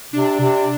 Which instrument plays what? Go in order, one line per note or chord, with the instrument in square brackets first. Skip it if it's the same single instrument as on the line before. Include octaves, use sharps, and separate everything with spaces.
[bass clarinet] C3 [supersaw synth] D4
[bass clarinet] C3